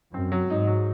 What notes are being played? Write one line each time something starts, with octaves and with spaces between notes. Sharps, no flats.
F#2 C4
F#3
G#2 D#4
F#3